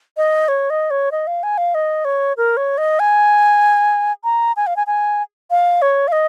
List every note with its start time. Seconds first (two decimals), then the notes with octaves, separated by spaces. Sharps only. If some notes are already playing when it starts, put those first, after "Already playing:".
0.17 D#5
0.48 C#5
0.70 D#5
0.91 C#5
1.12 D#5
1.27 F5
1.43 G#5
1.58 F5
1.75 D#5
2.05 C#5
2.37 A#4
2.57 C#5
2.78 D#5
2.99 G#5
4.24 A#5
4.56 G#5
4.67 F5
4.77 G#5
4.87 G#5
5.51 F5
5.82 C#5
6.08 F5
6.12 D#5